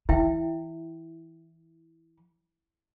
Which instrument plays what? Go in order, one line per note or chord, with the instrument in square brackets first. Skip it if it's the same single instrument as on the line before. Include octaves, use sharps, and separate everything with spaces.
[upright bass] E3 [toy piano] E4 E5 G5